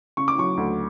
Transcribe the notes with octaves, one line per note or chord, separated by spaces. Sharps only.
C#3 C#6
D6
F#3 C#6
D2